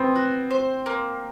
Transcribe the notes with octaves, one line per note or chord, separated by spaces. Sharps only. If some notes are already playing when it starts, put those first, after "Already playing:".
Already playing: B3 C4
F#4
C5
A#3